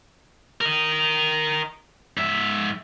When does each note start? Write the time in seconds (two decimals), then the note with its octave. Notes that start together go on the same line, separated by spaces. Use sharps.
0.61 A#4 D#5
2.18 G#2 E5